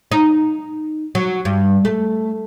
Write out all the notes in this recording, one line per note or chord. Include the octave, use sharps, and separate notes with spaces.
D#4
F#3
G2
A3